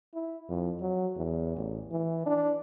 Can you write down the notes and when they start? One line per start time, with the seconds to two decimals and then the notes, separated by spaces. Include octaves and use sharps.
0.14 E4
0.49 F2
0.81 F#3
1.16 E2
1.56 A1
1.91 E3
2.26 D4